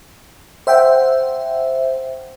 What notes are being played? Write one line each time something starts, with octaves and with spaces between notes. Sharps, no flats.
C5 E5 F#5 G5